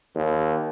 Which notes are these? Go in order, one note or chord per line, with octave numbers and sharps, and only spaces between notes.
D#2